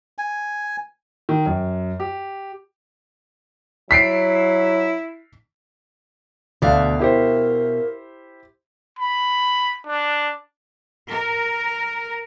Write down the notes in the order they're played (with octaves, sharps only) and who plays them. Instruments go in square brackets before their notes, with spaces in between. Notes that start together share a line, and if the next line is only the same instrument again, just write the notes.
[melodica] G#5
[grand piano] D#3
F#2
G4
[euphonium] F#3 [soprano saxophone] E4 [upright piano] B6 C7 D7
[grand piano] D2 D5 [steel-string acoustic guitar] B2 E5 F5
[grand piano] E4 G4 C5 [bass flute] A#4
[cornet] B5
D4
[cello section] A#4